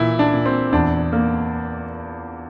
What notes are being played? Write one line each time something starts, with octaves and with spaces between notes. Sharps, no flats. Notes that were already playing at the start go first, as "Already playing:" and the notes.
Already playing: A#2 E3 E4
D4
A#2
C4
E2 D4
A#3